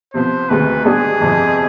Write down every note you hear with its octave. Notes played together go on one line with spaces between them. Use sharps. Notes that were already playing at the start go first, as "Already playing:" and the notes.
C3 F3 B3 C5
D2 C3 D#3 G#3 B3 B4
G#2 G3 B3 D4 G4 G#4
G1 F2 C3 F3